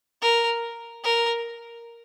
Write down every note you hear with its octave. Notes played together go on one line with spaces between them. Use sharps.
A#4
A#4